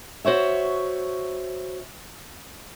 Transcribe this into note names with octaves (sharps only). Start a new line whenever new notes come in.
F#4 C5 C#5 E5